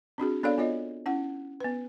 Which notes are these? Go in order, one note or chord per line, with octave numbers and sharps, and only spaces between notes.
C4 D4 F#4 G#4
B3 D4 A4 C#5 D5 F5
B3 F4 C#5 D#5
C#4 E4 F#5
B3 B4